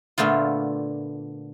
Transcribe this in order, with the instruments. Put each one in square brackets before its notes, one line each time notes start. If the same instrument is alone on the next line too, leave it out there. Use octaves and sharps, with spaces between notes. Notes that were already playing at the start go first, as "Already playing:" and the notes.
[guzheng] A#2 D3 A3 B3 F4